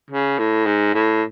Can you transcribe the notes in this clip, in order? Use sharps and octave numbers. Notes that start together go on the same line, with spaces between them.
C#3
A2
G#2
A2